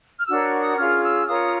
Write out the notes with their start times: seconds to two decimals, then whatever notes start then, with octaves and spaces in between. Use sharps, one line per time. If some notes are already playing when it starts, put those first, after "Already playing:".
0.20 F6
0.28 D4 F#4 A#4 C#5 E6
0.61 D#6
0.77 C#4 F4 G#4 F6
1.03 E6
1.28 F4 A#4 C#5 D#6